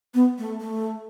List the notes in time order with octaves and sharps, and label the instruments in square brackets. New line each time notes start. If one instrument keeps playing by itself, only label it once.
[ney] B3
A3
A3